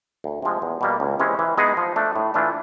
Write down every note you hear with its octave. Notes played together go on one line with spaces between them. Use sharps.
D2
C3 F3 G#3
E2
B2 G3 A#3
C#2
C3 E3 G#3 C#4
E3
G#3 B3 D#4 G#4
F3
A3 D4
A2
E3 A3 D4 F4